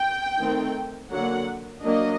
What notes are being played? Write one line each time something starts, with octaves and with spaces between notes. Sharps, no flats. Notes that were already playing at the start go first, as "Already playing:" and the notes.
Already playing: G5
D#3 A3 C4
D3 F#3 A#3 F#5
F#3 A#3 D4 D#5